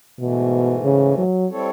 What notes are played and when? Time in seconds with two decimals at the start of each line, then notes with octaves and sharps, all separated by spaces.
0.20 G#2 B2 E3 A3
0.84 C#3
1.17 F#3
1.49 G3 C4 E4 A4 C#5